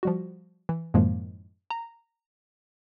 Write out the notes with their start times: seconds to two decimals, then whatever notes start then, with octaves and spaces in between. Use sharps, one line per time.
0.03 F3 G3 F#4
0.69 E3
0.94 F#2 A2 D#3 F3 G#3 A#3
1.70 A#5